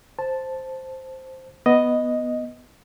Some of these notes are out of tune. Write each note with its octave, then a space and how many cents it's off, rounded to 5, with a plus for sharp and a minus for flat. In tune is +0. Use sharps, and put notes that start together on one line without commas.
C5 +0 A5 +0
B3 +0 D#5 +0